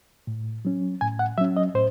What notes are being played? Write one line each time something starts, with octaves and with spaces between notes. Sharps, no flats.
A2
F#3 C#4
A2 G#5
F#5
F#3 C#4 E5
D#5
A2 C5